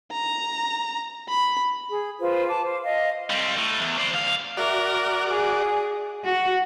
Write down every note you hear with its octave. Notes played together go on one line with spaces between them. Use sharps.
A#5
B5
G#4
F4 B4 C5
A5 D6
C5
D#5 F5
G3 C4
A2
E2
C5 D5
D2 F5
F#4 A#4 D5 E5
G#4 G#5
F#4